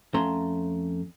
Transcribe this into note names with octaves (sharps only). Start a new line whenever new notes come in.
F2 A3 C#4 A#5 C6